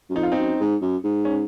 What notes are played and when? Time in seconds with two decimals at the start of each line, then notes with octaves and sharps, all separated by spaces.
0.10 F#2
0.15 F2 D#4
0.23 F4
0.32 C4 D#4
0.37 F#2
0.60 G#2
0.81 F#2
1.04 G#2
1.25 C#4